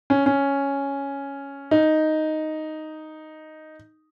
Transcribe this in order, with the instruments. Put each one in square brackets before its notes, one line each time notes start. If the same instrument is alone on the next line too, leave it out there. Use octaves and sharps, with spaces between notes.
[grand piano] C#4
C#4
D#4